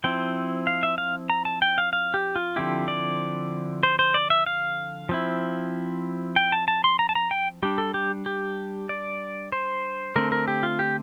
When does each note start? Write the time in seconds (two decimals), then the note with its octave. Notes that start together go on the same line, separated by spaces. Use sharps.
0.04 F3 C4 E4 G5
0.67 F5
0.83 E5
0.98 F5
1.30 A#5
1.45 A5
1.62 G5
1.78 F5
1.93 F5
2.14 G4
2.36 F4
2.56 D3 F3 C4 E4 G4
2.88 D5
3.83 C5
3.99 C5
4.14 D5
4.30 E5
4.46 F5
5.09 F3 C4 E4
6.36 G5
6.52 A5
6.68 A5
6.84 C6
6.99 A#5
7.09 A5
7.15 A#5
7.31 G5
7.63 G3 D4 G4
7.78 A4
7.94 G4
8.26 G4
8.89 D5
9.52 C5
10.16 D3 A3 C4 A#4
10.32 A#4
10.48 G4
10.63 F4
10.79 G4